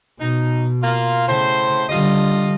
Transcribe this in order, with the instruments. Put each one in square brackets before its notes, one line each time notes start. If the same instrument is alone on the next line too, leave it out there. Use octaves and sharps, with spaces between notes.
[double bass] B2 [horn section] D#4
[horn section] A#3 F4
[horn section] A2 C5 [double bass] C#3
[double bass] D3 G3 [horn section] F4 D#5